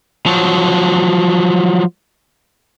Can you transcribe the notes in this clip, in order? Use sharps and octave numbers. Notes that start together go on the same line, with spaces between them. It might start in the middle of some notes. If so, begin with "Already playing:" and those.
F3 F#3